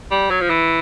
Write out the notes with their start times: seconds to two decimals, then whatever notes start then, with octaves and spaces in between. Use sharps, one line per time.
0.11 G3
0.31 F#3
0.41 F3
0.50 E3